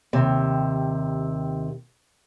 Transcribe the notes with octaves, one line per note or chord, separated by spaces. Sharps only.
D#2 C3